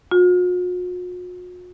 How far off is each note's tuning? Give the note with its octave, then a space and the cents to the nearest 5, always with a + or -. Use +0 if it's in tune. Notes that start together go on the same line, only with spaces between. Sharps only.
F#4 -45